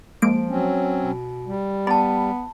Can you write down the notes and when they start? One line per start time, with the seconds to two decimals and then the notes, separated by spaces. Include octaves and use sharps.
0.22 F3 G#3 A#3 D7
0.49 F#3 C4 C#4
0.98 B2
1.47 G3
1.87 B3 D5 A5 B5